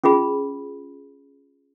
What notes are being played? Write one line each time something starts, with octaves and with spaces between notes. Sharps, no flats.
C#4 F4 G#4 B5